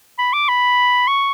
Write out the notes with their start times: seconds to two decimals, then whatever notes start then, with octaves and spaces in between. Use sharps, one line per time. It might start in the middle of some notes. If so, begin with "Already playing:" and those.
0.18 B5
0.33 D6
0.48 B5
1.07 C#6